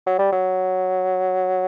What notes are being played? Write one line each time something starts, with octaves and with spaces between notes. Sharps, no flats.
F#3
G3
F#3